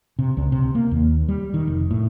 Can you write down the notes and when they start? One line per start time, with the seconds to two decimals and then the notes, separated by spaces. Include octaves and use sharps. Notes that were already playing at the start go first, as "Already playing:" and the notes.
0.19 C3
0.37 C#2
0.52 C3
0.75 A#3
0.91 D#2
1.29 G3
1.54 D#3
1.68 F1
1.91 A2